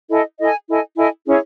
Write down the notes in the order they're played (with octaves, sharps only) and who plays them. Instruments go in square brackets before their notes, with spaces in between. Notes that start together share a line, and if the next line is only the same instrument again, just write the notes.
[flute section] E4 A4 D#5 G#5
E4 A4 D#5 G#5
E4 A4 D#5 G#5
E4 A4 D#5 G#5
C#4 E4 G#4 C#5